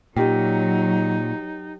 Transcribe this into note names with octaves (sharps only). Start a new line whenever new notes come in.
A#2 F#3 D#4 G4 A#4 G5